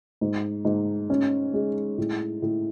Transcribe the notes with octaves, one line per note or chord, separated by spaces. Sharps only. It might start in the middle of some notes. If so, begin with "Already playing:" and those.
G#2
G#2
C#4
G#3
A2
A2